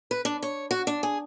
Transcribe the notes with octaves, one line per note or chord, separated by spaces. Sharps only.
B4
D4
C#5
F#4
D4
G#4